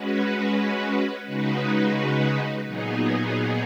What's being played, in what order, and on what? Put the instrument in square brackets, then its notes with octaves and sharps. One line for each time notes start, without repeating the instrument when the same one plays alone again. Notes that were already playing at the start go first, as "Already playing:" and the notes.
Already playing: [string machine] G#3 C#4 F#4 B4
C#3 G#3 D#4 F#4 B4
A#2 F#3 B3 D#4 G#4